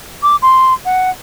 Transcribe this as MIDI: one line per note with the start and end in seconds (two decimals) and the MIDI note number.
0.23 0.36 86
0.42 0.73 84
0.85 1.10 78